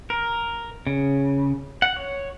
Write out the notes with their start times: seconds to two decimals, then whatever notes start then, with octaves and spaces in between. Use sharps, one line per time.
0.10 A#4
0.87 C#3
1.82 F#5
1.96 C#5